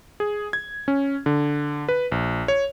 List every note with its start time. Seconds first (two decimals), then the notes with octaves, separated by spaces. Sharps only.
0.20 G#4
0.53 G#6
0.88 C#4
1.26 D3
1.89 B4
2.12 A#1
2.48 C#5